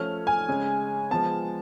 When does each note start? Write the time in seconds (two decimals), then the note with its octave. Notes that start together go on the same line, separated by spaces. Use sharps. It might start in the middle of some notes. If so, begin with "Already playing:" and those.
Already playing: F3 A3 C#4 F6
0.27 G#5
0.48 C#3 G#3 C#4
1.11 F3 G#3 B3 A5